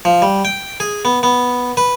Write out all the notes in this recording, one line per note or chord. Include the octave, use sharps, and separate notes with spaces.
F3
G3
G5
G#4
B3
B3
B4